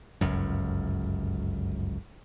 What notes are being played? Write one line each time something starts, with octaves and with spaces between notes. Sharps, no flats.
G1 C#2 F#2